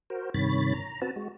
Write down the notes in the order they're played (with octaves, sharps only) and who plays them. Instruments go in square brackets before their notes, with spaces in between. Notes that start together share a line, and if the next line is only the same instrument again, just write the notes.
[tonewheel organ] F#4 A#4 C5
G2 C3 D#3 C#5 B5 A6
A#5
C4 F#4 B4 A5
G#3 F#4